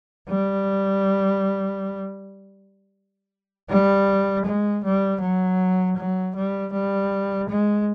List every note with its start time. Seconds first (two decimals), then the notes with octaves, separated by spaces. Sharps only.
0.28 G3
3.69 G3
4.45 G#3
4.84 G3
5.21 F#3
5.97 F#3
6.36 G3
6.73 G3
7.49 G#3